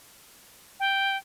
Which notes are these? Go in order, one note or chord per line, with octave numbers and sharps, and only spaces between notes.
G5